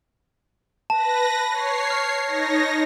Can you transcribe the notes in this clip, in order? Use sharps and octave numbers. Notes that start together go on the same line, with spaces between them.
B4 A5 A#6
C#5 C7
F6
D#4 C#5 A#6